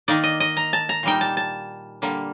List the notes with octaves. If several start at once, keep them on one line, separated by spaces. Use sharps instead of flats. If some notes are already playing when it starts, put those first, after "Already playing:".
D#3 A#3 D#4 D5
D#5
D#5
A#5
A5
A#5
A#2 G3 A#3 D#4 G5
A5
A5
D3 G3 A#3